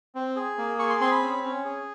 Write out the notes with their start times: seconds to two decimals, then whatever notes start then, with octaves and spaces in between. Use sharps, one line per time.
0.15 C4
0.36 G#4
0.58 A#3
0.79 G#4 C#6
0.90 C6
1.00 C4 C6
1.11 B5
1.22 C#4
1.43 C#4
1.65 G#4